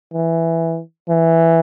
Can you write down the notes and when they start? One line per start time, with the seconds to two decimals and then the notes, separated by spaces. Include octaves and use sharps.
0.14 E3
1.09 E3